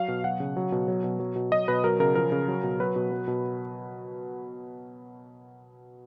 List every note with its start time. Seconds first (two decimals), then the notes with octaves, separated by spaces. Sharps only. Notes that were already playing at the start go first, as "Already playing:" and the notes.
Already playing: F#3 F5
0.08 B2
0.24 F#3 F#5
0.40 C#3
0.57 F#3
0.72 B2
0.88 F#3
1.04 B2
1.20 F#3
1.36 B2
1.52 F#3 D#5
1.68 B2 B4
1.84 F#3 A#4
2.00 C#3 A#4
2.15 F3 A#4
2.32 C#3
2.48 F#3
2.63 B2
2.80 F#3 B4
2.96 B2
3.12 F#3
3.28 B2